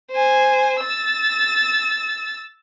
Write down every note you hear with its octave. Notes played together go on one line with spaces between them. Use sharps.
C5 G#5
E6 A6